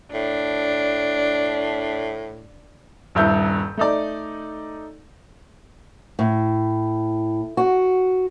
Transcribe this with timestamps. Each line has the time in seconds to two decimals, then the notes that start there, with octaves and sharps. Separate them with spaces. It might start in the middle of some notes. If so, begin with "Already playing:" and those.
0.14 A2 D4
3.15 D#1 G2 E4 G6
3.77 A3 D#4 D5
6.19 A2
7.57 F#4